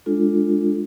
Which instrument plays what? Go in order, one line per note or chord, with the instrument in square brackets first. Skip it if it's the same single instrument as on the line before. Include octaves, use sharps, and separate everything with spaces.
[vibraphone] G#3 D4 F4 A4